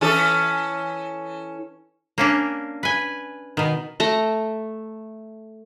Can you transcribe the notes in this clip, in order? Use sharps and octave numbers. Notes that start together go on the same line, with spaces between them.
E3 C#4 A4
A#3 C#4 D4
B4 G#5
B2 D#3
A3 A#5